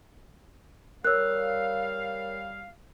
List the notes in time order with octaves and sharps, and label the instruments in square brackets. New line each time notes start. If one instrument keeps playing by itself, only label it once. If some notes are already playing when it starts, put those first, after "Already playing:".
[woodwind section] G3 F5 [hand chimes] A#4 C#5 [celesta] E6 F#6